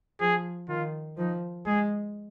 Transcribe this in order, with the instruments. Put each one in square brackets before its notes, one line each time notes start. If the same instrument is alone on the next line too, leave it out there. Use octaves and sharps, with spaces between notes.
[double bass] F3 [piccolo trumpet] G#4
[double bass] D#3 [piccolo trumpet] F4
[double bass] F3 [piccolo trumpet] D#4
[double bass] G#3 [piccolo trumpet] G#4